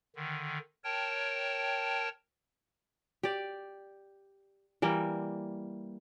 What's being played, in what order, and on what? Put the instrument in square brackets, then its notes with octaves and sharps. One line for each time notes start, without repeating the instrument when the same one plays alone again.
[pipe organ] D3 D#3
A#4 C#5 G5 A5
[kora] G4 D5
E3 G3 A#3